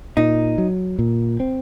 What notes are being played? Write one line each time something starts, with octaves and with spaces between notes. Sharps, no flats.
A#2 D#4
F#3
A#2
C4